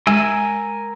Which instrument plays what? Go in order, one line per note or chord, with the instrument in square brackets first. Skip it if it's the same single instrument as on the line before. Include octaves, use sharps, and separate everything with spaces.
[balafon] G#3 [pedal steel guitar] A#4 G#5 E6